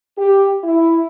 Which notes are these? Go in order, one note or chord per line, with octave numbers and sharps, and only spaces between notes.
G4
E4